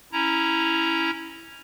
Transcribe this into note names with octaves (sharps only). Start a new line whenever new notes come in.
C#4 E4 A#5